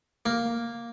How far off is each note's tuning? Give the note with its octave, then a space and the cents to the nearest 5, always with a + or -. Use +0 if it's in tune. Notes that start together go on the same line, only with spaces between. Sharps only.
A#3 +0